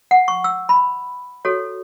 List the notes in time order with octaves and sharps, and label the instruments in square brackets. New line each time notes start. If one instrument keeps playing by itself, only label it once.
[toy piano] F#5
C#6
E6
B5
F#4 A4 C#5